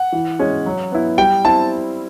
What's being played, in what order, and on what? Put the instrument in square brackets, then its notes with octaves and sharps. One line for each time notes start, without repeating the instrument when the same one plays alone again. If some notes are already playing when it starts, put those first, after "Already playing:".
Already playing: [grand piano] F#5
[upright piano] E3
G#3 C#4
F#3
B3 E4
[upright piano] G3 [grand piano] G5
[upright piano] C4 E4 [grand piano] A5